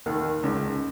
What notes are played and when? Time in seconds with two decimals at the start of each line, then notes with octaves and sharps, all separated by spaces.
0.06 D#2 D#3
0.43 C#2 C#3